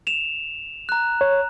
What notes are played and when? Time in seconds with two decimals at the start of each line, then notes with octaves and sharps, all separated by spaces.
0.07 E7 F7
0.89 A#5 F#6
1.21 C#5